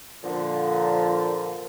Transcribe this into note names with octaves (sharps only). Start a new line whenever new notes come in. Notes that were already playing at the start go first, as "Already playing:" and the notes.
A#2 D3 F3